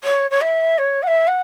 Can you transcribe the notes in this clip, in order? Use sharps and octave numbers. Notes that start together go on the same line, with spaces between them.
C#5
C#5
E5
C#5
F#5
E5
F#5